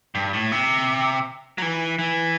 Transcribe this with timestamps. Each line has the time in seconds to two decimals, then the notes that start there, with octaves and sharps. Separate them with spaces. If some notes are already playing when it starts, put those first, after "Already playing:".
0.15 G2
0.33 A2
0.52 C3
1.58 F#3
1.62 E3
1.99 E3